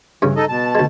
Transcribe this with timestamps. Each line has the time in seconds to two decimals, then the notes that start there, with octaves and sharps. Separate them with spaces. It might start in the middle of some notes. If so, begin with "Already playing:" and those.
0.22 G2 C#3 E3
0.36 D#4 A4 D#5
0.49 B2 A5
0.75 D2 G#3